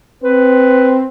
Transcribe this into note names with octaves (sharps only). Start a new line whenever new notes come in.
C4 B4